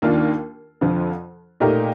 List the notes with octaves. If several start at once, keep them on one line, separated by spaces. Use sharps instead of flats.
D#2 D#3 A#3 D4 F4
F2 D3 F3
A#2 A3 D#4 G4 A#4